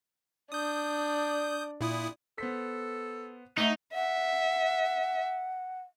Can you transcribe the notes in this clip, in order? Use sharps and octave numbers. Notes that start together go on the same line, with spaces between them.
D4 D#6 G6
A#2 E4 D#6
B3 A4 C5 B6
A3 D#4 D#5 E5 F#5
E5 F#5